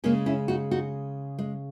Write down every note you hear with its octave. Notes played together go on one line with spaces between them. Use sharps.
C#3 G#3 A#3 C#4
C#4 E4
D#4 F#4
D#4 F#4
G#3